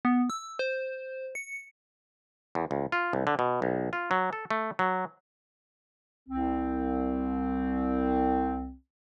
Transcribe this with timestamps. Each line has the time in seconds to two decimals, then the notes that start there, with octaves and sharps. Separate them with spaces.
0.05 B3
0.30 E6
0.59 C5
1.35 C#7
2.55 E2
2.71 C#2
2.92 F4
3.13 C2
3.27 D3
3.39 B2
3.62 B1
3.93 F4
4.11 F#3
4.33 A4
4.51 A3
4.79 F#3
6.29 C2 C4